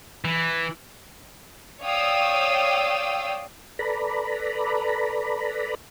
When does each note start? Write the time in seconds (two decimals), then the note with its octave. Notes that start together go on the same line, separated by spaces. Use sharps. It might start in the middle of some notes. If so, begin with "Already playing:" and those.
0.25 E3
1.81 C#5 D5 F5 G5 D#6 E6
3.79 A4 B4 D5 A#5 B5